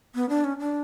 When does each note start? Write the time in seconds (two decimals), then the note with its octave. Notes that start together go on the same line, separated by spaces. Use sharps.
0.15 B3
0.29 D4
0.44 C#4
0.59 D4